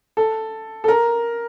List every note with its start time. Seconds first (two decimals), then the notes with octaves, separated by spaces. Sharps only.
0.17 A4
0.84 A4
0.88 A#4